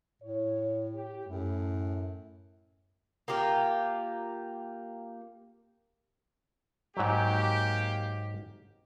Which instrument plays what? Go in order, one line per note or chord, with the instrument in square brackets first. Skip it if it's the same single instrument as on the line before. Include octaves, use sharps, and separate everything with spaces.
[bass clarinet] A2 [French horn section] C#5
[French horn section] G4
[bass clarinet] F#2 [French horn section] A2
[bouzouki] A#3 F4 G4 A#4
[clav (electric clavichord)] G#2 F#3 [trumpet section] A#3 G4